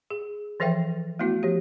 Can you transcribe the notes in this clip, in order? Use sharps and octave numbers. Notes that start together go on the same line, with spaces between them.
G#4
E3 F3 A4 E5 F5 G5
A3 B3 E4 F#4
F3 G4